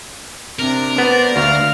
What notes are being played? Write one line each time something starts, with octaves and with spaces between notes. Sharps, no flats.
C3 D4 A#4
B3 C5 D5
D2 F5 F6